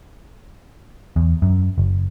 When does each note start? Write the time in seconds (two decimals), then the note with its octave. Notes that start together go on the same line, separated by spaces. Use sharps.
1.16 E2
1.42 F#2
1.78 F#1